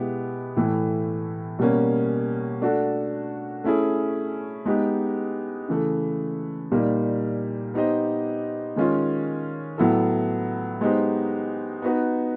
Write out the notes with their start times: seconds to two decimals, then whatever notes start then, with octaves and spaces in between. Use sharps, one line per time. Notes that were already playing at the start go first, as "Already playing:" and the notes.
Already playing: B2 G#3 B3 E4 G4
0.57 A2 E3 A3
1.59 B2 G3 A#3 C#4
2.61 A3 D4 F#4 A4
3.64 A3 C#4 E4 G#4
4.66 G#3 B3 D#4 G4
5.69 C#3 E3 A3
6.72 A#2 G3 A#3 D#4
7.74 B3 D#4 G4 C5 D#5
8.76 D#3 G#3 C#4 F4
9.78 A2 F#3 B3 E4 A4
10.81 G#3 B3 D#4 G4 C5
11.82 B3 D#4 F#4 B4